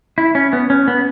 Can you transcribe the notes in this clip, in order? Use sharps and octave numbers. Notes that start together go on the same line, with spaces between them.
E4
C#4
B3
C#4
B3